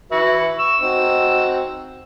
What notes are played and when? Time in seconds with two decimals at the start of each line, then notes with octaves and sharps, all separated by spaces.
0.12 F#4 B4 E5
0.59 C#6 E6
0.82 C4 D#4 F#4